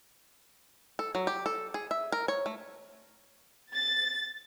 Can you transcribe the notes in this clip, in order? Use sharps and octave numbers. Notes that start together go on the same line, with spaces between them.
A4
F#3
G4
A4
G#4
E5
A#4
C#5
A3
A6